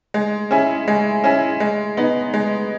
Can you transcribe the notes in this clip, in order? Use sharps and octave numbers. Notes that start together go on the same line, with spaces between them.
G#3
C#4 E4 G#4
G#3
C#4 E4 G#4
G#3
B3 D#4
G#3